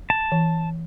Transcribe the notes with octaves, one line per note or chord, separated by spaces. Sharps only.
A5
E3